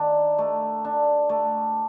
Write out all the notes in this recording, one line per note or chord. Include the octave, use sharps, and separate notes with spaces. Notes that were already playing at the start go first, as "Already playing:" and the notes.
Already playing: D#3 D4
A3
D4
A3